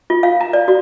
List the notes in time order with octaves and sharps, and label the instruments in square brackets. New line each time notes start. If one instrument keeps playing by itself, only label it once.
[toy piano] F4
F5
A#5
D5
F#4